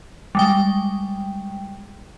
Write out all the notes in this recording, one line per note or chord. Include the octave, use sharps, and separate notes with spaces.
G3 G#3 G5